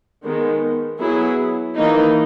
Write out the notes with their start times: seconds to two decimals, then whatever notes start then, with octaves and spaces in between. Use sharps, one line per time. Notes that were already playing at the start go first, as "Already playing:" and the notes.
0.23 D#3 G#3 B3
0.99 F#3 B3 E4 G#4
1.75 E3 A#3 D#4